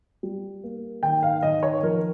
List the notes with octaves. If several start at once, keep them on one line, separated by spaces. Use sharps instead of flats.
G3
A#3
D#3 G5
F5
D#3 D#5
C#5
F3 A#4